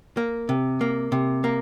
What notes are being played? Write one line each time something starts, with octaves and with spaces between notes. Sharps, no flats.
A#3
C3
A#3
C3
A#3